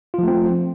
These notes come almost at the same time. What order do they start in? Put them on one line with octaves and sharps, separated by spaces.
F4 F3 A3 C4